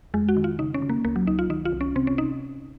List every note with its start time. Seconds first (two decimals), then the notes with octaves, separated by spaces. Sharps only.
0.14 F2 G#3
0.29 F#4
0.37 D#3
0.44 F4
0.59 C#3 D#4
0.74 C#4
0.82 C#3
0.89 A#3
1.04 C#2 A#3
1.16 F#3
1.27 C#2 D#4
1.39 F4
1.50 D#3 D#4
1.65 F4
1.72 C2
1.81 C#4
1.96 C3 C4
2.07 C#4
2.18 D#4